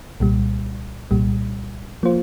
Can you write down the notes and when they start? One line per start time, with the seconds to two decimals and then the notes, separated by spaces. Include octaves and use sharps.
0.20 C2 A#2 G3
1.11 C2 A#2 G3
2.03 F3 A#3 F4 C5